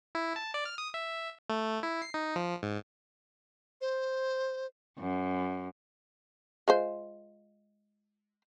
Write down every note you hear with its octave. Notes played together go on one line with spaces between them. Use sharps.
E4
A5
D5
F6
D#6
E5
A3
E4
C7
D#4
F3
G#2
C5
F#2
G#3 F4 C5